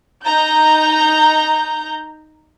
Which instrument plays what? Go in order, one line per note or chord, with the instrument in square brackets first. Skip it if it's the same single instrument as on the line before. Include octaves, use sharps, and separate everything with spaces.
[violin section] D#4 A#5 G6